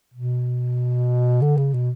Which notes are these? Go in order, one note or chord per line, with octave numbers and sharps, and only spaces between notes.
B2
D3
C#3
B2